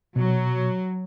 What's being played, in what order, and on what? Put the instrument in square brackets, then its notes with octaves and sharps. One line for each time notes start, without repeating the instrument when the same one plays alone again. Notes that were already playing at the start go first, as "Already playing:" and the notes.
[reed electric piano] B2 [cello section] F#3